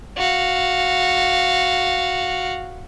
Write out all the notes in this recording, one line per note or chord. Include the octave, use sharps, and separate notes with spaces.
F#4 F5